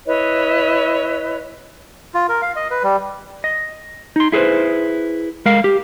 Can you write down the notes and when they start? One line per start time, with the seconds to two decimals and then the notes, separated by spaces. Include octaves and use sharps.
0.07 E4 B4 C#5 D#5
2.14 F4
2.29 A#4
2.42 F5
2.56 D#5
2.70 B4
2.83 G3
3.44 D#5
4.16 D#4 C6
4.32 E4 G#4 A4 B4 C5
5.46 G#3 A#4 F5
5.64 G4